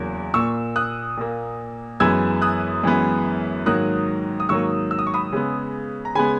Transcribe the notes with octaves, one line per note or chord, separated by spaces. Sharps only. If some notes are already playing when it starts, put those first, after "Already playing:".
Already playing: E2 C#3 F#3 A#3
A#2 A#3 C#6 E6
D#6 F#6
A#2 A#3
F#2 E3 G#3 B3 E6 G#6
D#6 F#6
F#2 E3 G#3 B3
G#2 D#3 F#3 A#3 D#6 F#6
D#6
G#2 D#3 F#3 A#3 C#6 E6
E6
D#6
C#6
B5 D#6
C#3 G#3 B3
A#5
C#3 G#3 B3 G#5 B5